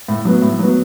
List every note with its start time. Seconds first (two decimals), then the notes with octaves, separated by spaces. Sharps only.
0.08 A2
0.25 F#3 B3
0.42 A2
0.59 F#3 B3